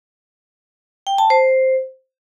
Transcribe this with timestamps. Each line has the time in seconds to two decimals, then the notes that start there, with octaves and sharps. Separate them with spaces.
1.07 G5
1.18 A5
1.30 C5